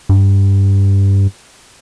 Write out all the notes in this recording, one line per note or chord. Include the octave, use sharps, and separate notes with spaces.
G2